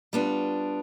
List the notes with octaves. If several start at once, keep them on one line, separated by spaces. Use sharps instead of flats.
G3 B3 D4 F4